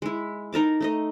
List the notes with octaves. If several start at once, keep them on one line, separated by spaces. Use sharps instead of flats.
G#3 E4
D#4 A#4 A5 D6
A3 D#4 D#5